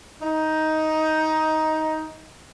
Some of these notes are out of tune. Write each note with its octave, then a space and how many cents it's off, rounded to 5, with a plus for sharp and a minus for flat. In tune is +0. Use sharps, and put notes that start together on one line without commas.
D#4 +10